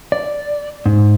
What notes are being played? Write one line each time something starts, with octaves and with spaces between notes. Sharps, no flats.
D5
G#2